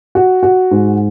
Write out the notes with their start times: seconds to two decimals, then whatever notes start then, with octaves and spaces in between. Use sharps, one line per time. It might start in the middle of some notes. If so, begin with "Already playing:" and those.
0.15 F#4
0.43 F#4
0.71 G#2